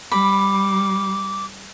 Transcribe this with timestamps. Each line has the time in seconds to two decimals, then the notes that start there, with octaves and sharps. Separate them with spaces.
0.12 G3 B5 D6